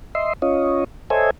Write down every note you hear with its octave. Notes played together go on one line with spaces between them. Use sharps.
D#5 E5 C6
C#4 F4 C#5 D#5
A4 C5 C#5 D#5 E5 G#5